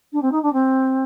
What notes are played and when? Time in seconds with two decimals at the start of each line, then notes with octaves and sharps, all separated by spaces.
0.13 D4
0.22 C4
0.31 D#4
0.42 D4
0.53 C4